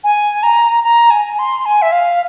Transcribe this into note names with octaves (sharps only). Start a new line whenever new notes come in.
G#5
A#5
A#5
G#5
C6
G#5
E5
F5